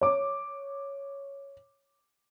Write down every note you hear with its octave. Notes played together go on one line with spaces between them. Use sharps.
C#5 D6